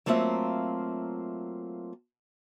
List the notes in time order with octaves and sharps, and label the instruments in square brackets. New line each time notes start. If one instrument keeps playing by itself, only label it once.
[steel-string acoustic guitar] F#3 A3 A#3 C4 F4 E5